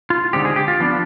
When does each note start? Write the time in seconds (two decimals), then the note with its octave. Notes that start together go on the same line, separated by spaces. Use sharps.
0.10 F4
0.33 D3 G#3 C4 D#4 G4
0.45 G#4
0.56 G4
0.68 F4
0.80 F3 B3 D4